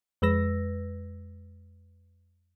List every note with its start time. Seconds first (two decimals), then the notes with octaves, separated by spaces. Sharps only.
0.22 F2 G#3 B4 E6 A#6